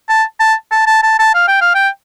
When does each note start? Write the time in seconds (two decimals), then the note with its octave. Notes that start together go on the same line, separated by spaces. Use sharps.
0.09 A5
0.40 A5
0.72 A5
0.87 A5
1.03 A5
1.19 A5
1.35 F5
1.48 G5
1.61 F5
1.75 G5